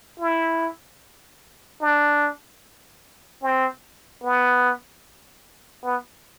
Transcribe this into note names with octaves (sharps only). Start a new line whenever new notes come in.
E4
D4
C4
B3
B3